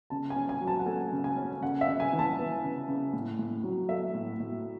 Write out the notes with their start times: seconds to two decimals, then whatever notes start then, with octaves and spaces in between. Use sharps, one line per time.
0.10 C#3 A5
0.30 G#5
0.36 C#4
0.49 G#5
0.61 F#3
0.67 A5
0.79 F#5
0.86 A3 G#5
1.12 C#3
1.24 G#5
1.37 C#4
1.62 C#3 F#5
1.81 E5
1.88 C#3
2.00 G#5
2.13 E3
2.19 A5
2.39 B3
2.63 C#3
2.88 C#3
3.13 A2
3.39 A2
3.64 F#3
3.89 A3 E5
4.14 A2
4.40 A2